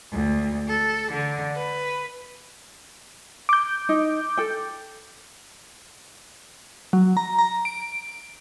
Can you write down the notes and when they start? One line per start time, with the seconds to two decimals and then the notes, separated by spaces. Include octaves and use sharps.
0.13 D2
0.67 A4
1.13 D3
1.56 B4
3.49 D6 G6
3.89 D#4
4.37 A4 G5
6.93 F#3
7.17 A#5
7.39 A#5
7.65 D7